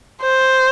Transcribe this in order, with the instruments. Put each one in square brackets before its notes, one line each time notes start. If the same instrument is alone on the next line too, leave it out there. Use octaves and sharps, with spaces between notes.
[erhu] C5